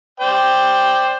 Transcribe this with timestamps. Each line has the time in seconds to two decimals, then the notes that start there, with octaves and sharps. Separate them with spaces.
0.20 C5 D5 G5